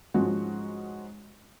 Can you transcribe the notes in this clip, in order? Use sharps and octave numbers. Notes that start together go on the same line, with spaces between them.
G#2 F3 G#3 C#4 F#4